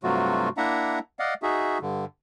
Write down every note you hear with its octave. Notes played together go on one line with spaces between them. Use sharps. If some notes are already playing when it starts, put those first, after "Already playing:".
G2 C3 F#3 A3 F4 F#4
A#3 D4 E4 E5 F#5 A#5
D5 D#5 F5 F#5
D#4 F#4 G#4 E5
G2 D3